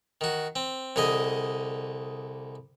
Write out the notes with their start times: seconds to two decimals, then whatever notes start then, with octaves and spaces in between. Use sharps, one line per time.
0.21 D#3 F#4
0.56 C4
0.96 C2 D3 G#4 D#5